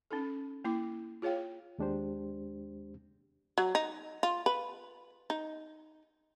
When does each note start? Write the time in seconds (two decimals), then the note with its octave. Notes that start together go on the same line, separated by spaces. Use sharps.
0.11 C#4 D#4 A4
0.64 A#3 E4 D6
1.22 F4 G#4 C#5 F5 G5
1.78 D#2 G#3 D4 G4 C5
3.58 F#3
3.75 D#4
4.23 F4
4.46 B4
5.30 D#4